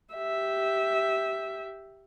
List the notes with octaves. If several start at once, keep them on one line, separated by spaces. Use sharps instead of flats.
G4 E5